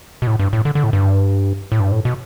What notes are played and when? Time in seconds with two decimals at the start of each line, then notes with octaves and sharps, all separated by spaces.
0.22 B2
0.27 A2
0.40 G2
0.53 A2
0.65 D3
0.75 D3
0.84 A2
0.93 G2
1.72 A2
1.80 G2
1.92 A2
2.05 B2